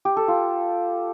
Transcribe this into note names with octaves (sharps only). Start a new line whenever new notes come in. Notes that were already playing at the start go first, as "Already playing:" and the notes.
G4
A4
F4